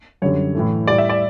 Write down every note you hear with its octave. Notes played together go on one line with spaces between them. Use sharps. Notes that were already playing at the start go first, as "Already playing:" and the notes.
F#2 D3 G3 C#5
A2 E3 A3
A2 G3 D5
E5
D5